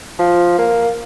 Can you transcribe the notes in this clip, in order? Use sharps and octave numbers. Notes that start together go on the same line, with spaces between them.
F3
A#3